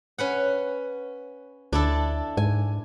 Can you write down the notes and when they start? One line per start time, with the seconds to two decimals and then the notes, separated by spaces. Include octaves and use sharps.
0.18 C#4 B4 F#5
1.73 D2 D4 E4 A4
2.37 G#2 G#5